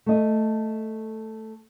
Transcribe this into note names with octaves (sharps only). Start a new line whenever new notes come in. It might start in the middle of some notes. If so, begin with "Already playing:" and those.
A3 D#5